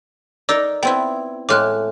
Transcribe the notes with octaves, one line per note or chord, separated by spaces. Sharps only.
D#4 A#4 D5 D6 E6
B3 C4 E4 G5
A2 G#3 D6 F6 F#6